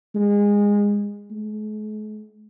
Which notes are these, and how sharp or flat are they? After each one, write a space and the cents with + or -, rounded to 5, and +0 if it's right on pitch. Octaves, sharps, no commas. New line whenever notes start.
G#3 -20
G#3 +45